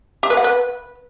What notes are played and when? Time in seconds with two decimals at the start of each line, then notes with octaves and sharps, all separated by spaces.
0.23 G4
0.30 B4
0.37 F#5
0.44 B4